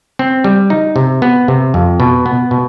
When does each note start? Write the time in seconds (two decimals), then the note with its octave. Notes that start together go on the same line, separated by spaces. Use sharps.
0.19 C4
0.44 G3
0.70 D#4
0.96 C3
1.22 B3
1.48 C3
1.74 F2
2.00 B2
2.26 B3
2.51 B2